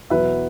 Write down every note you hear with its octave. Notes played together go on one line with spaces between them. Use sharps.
E2 B2 F#3 B4 E5